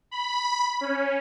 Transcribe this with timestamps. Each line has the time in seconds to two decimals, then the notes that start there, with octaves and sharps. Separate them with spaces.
0.11 B5
0.81 C#4